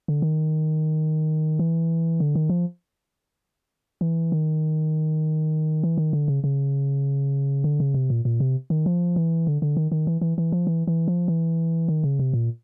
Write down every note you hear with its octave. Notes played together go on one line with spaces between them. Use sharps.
D3
D#3
E3
D3
D#3
F3
E3
D#3
E3
D#3
D3
C#3
C#3
D3
C#3
C3
A#2
A#2
C3
D#3
F3
E3
D3
D3
D#3
D#3
E3
E3
E3
F3
E3
E3
F3
E3
D#3
C#3
C3
A#2